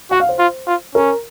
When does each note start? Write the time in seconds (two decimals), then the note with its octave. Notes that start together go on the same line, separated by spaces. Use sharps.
0.11 F#4 F#5
0.20 F5
0.29 C5
0.39 F4
0.67 F4
0.95 C#4 A#4